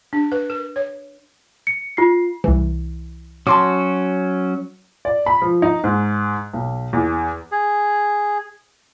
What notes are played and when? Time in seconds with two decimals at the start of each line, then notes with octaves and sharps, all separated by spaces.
0.13 D4
0.32 B4
0.50 A#4
0.76 C#5
1.67 C#7
1.97 F4 C7
2.44 C2 E3
3.47 F#3 C#4 F#4 A5 C6 D6
5.05 D5
5.26 B5
5.42 F3
5.62 D#4
5.84 G#2
6.53 B1
6.93 E2
7.52 G#4